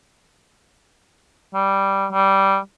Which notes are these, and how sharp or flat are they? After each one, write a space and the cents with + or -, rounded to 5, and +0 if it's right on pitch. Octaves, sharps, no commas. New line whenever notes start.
G3 -5
G3 -10